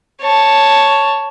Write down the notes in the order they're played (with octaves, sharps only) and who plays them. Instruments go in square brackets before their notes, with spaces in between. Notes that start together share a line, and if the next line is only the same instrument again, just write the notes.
[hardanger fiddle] C#5 A5